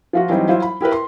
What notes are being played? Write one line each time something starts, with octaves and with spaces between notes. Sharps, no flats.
F3 F4 F#4
E3 F#3 G3 C4 D#4
F#3 E4 F4 C5
B5
E4 G4 A#4 B4
C6